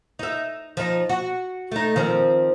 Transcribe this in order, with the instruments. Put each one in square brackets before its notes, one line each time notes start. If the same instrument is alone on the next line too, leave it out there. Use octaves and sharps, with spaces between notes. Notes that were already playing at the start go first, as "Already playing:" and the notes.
[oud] D#4 E5
F3 D#4
F#4
A3 D#4
D#3 F3 C4